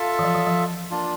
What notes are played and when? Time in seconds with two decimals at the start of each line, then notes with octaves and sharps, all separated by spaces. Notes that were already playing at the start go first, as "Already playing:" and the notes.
Already playing: F4 A4 E5
0.19 E3
0.24 F3
0.35 E3
0.46 F3
0.91 A#3 D4 F4